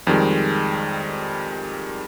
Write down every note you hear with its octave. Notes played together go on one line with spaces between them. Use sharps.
F2 D#3 G3 G#3